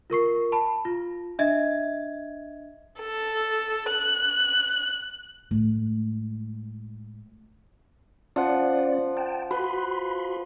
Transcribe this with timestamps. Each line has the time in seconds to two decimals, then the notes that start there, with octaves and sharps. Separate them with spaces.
0.10 F4 A#4 C#6 C7
0.52 A5 B5
0.85 F4
1.39 D4 D#5 E5 G#6
3.01 A4
3.90 F#6
5.51 A2 G#3
8.36 F3 C#4 D5 F#5
9.17 G5 A5
9.51 F#4 B4 B5 C6